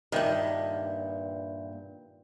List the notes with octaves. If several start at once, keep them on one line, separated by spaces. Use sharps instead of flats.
G2 A#2 D#3 E5 G5 G6